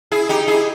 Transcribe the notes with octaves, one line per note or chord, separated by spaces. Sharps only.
E4 G#4
D#4 G4
E4 G#4